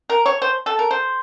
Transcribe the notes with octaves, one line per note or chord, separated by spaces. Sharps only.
A#4
C#5
C5
A4
A#4
C5